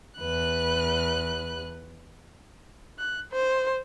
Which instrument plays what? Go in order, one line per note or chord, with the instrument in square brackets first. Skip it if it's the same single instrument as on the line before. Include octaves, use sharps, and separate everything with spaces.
[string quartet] E2 B4 F#6
[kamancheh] F#6
C5